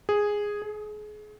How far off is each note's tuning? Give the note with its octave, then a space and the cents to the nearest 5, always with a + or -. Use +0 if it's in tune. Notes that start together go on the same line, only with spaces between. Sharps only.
G#4 -5
G#4 +30